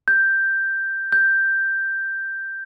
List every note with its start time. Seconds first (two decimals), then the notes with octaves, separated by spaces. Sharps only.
0.08 G6
1.12 G6